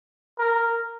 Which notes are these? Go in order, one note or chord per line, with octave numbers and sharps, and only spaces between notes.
A#4